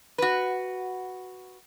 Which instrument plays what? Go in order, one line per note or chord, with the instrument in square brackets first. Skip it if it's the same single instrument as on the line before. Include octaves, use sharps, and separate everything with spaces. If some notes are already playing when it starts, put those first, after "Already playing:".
[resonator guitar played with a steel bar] F#4 B4